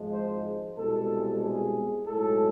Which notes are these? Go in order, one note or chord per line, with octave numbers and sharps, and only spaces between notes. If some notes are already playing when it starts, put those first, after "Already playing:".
Already playing: G#1 G#2 F3 G#3
C5
C2 B2 G#3 A4
G#4
B1 A2 G#3 A4